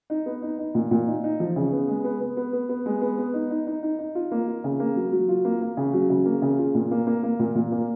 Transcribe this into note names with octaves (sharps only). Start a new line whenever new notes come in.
D#4
B3
D#4
D#4
A#2
A#2
D#4
D#4
F3
C#3
B3
G#3
B3
B3
B3
B3
B3
G#3
B3
B3
D#4
D#4
D#4
D#4
D#4
F4
A#3
F4
C#3
A#3
F#3
F#3
F4
A#3
A#3
C#3
F#3
C#3
A#3
C#3
F4
A#2
A#3
A#3
A#3
A#2
A#2
A#3